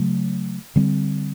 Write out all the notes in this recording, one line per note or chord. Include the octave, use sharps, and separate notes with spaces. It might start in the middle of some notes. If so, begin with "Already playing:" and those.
Already playing: C#3 F#3 A3
D3 G3 C4